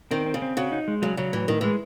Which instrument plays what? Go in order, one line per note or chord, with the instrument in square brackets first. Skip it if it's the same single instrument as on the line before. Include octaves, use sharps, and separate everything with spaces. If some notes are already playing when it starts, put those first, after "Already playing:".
[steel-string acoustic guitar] D#3 [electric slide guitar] C4
[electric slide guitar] C4
[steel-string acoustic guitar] C#3
[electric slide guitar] C4
[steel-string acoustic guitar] C#3 [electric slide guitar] F#4
[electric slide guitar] D#4
G#3
[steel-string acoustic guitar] C#3 [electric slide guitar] F#3
[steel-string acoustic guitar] C#3 [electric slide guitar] F#3
[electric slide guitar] A2 [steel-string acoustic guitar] E3
[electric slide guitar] A2 [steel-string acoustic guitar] D#3
[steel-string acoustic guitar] E3 [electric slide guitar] G#3